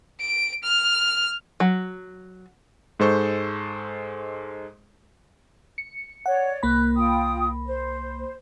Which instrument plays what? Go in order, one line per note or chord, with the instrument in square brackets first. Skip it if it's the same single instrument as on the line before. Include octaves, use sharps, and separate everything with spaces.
[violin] D7
F6
[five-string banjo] F#3
[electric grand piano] G#2 G#3 A4 C5 C#6 G6
[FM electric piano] C#7
[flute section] C#5 D5 [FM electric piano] F#5
[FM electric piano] C2 A#3 B5 [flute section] F#6
[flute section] F4 G5 D#6
C5